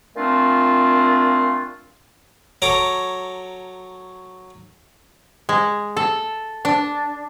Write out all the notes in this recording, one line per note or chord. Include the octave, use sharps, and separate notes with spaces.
A#2 A3 C4 D4 F4
F#3 A4 C#5 A#5 D6
G#3
A4
D4